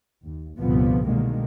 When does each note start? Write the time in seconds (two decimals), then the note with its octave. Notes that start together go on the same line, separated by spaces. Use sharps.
0.24 D#2
0.59 C2 G2 A#2 D3 F3 B3
1.06 B2 D3 D#3 G#3 A#3